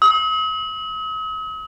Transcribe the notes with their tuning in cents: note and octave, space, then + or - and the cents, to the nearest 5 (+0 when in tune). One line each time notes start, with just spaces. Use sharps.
D#6 +45